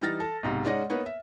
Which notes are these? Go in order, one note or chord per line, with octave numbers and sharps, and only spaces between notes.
E3 G3 D#4 F6 A6 A#6
A4
B1 G#2 C3
G#3 C#4 D#4 D5 D#5 F#5
A#3 B3 D#4 B4 C#5
E5